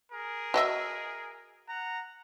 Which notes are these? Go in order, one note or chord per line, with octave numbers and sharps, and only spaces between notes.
G#4 A#4
F#4 D#5 E5
F#5 A#5